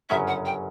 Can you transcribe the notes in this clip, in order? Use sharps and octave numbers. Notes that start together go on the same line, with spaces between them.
G1 F#2 C#3 F#3 C#4 E5
F#5
G5